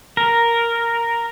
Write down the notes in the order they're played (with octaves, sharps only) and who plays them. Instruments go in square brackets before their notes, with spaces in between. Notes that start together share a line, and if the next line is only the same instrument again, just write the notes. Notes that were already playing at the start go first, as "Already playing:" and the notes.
[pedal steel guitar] A#4